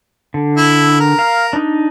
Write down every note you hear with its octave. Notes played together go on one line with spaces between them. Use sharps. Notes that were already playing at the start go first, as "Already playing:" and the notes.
D3
E4
A#4
F5
D4 D#4